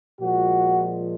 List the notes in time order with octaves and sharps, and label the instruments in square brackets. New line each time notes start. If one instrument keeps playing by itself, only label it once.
[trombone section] A#2 F3 G#3 F#4